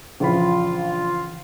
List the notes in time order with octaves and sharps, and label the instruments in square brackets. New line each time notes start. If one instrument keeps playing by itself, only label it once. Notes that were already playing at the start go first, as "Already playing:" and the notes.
[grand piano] A#1 B5 [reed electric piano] C#3 E3 [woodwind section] F4